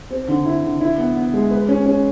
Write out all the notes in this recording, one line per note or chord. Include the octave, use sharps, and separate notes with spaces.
C4
D3
E4
D3
E4
B3
B3
G#3
B4
C#4
C#4